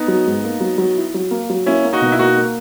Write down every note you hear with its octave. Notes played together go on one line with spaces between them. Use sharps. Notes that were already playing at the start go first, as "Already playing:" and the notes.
Already playing: B3 D#4
F#3
G#2
A#3
F#3
F#3
E4
F#3
A#3
F#3
A#3 C#4 E4
A#3
D#4 F#4
B2
E4
A#3 D#4 F#4
A#3